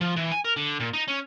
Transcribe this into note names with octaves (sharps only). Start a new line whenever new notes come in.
F3
E3
G#5
A#4
D3
A#2
D#4
C#4